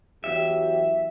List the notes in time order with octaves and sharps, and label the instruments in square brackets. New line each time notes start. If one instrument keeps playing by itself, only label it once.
[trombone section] E2 F#3 G4 [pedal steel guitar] E5